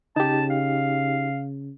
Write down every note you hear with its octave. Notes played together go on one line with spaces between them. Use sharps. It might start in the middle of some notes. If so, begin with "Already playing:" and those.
C#3 D#4 G4 A5
F5